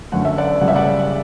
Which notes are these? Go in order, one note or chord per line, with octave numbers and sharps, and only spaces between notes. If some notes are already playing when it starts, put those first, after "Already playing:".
F#2 D3 A3 C#4 F#5
E5
D5 F#5
F#1 F#2 C#3 G3 F#5
E5
D5 F#5